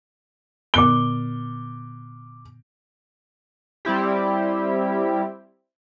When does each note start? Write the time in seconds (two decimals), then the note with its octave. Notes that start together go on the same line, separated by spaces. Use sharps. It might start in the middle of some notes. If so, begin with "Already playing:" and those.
0.74 A#2 D3 B3 D6 G7
3.85 G3 C4 E4 G4